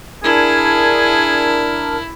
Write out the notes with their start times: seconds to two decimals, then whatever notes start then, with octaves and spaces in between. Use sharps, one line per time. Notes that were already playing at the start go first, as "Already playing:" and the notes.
0.24 D4 E4 G#4 A#4